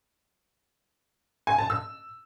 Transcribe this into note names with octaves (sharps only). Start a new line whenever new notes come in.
G#5
A5
E6